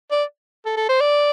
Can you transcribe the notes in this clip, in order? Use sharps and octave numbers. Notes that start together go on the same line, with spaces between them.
D5
A4
A4
C5
D5